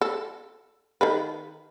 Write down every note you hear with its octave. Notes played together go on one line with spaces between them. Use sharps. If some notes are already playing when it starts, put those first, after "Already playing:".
A4
D#3 A4 B4